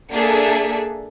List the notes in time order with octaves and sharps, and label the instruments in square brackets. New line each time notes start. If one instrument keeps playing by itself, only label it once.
[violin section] A#3 D4 G#4 A4 E5